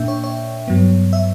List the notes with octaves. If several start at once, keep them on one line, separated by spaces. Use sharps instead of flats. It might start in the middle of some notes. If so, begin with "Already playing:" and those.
Already playing: A#2 A#3 D4 E5 G5
C#5
C#5
G2 F#3 B3
E5